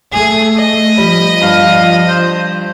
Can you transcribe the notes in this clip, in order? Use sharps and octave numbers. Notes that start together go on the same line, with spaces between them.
A3 G#4
D#5
F3 G3 B5
G2 F5
C5